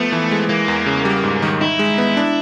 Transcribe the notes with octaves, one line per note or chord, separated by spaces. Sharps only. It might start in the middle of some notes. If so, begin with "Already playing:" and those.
Already playing: F3 A3 B3
E3
G#3
E3 A#3
E2
C#3
G3
G#2
D#3
D#4 E4
G#3
B3
D4